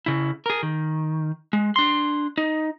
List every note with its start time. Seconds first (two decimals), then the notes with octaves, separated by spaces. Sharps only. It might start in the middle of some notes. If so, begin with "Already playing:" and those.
0.06 C#3 E4
0.46 G#4 A#4
0.63 D#3
1.53 G#3
1.76 D4 C6
2.38 D#4